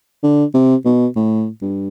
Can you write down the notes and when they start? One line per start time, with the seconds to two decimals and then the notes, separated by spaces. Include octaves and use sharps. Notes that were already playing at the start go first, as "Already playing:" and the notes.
0.23 D3
0.54 C3
0.85 B2
1.16 A2
1.62 G2